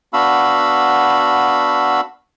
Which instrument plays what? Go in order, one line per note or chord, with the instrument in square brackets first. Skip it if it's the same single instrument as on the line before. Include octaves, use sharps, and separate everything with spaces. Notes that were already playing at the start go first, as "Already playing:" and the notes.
[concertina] B3 D4 F#4 F5 B5 E6